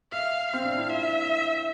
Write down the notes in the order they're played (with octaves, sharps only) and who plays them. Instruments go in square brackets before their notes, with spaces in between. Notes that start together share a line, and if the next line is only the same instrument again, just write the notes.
[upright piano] E5 [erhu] F5
[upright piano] C4 [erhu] F5
[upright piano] D4
E4
[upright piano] F4 [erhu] E5